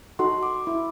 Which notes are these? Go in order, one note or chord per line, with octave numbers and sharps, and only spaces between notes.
D#4 F#4 A4 C6
D6
E4